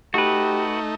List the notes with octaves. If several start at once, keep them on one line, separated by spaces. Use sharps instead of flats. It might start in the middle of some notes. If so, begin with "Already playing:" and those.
A3 D#4 F#4 G4 B4